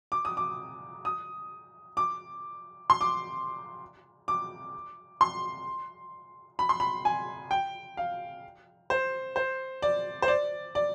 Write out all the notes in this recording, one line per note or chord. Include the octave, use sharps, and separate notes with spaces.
D6
D#6
D6
D#6
D6
C6
D6
D6
C6
B5
C6
B5
G#5
G5
F5
C5
C5
D5
C5
D5
D5